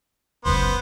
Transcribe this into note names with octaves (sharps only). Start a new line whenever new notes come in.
F#1 C#2 F#2 B3 C5